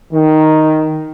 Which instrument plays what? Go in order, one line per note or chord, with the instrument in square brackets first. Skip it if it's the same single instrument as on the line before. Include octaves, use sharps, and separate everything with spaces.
[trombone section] D#3